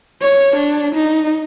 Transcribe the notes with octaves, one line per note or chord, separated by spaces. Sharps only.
C#5
D4
D#4